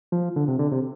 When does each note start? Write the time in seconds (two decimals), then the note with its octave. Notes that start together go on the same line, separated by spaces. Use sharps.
0.12 F3
0.36 D3
0.48 C3
0.59 D3
0.72 C3